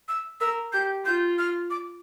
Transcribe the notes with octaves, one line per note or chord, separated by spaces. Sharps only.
E6
A#4 E6
G4 G6
F4 G6
F6
D6